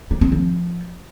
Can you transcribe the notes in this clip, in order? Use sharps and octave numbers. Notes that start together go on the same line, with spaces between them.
G3
C4
F3